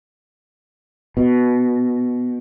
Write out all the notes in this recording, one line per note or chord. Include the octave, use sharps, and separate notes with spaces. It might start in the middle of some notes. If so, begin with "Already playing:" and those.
B2